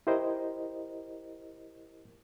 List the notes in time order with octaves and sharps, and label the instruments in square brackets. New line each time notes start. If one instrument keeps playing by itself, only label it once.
[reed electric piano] E4 G4 A#4 C5 D#5